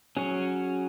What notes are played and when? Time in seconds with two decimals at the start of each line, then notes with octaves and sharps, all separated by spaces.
0.17 F#3 C#4 G#4 C#5